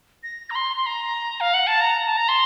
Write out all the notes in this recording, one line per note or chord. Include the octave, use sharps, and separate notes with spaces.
A#6
A#5
C6
C6
A#5
F5
F#5
A5
A#5
A5
A#5
C6